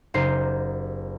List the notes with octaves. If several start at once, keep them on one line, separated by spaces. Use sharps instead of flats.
F#1 D#4 G4 C5 C7